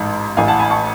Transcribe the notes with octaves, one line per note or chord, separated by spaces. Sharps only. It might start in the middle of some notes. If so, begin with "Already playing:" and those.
Already playing: A1 G#2 A5
A1 A2 F5 G#5
F#5 A5
G#5 B5
A5 C#6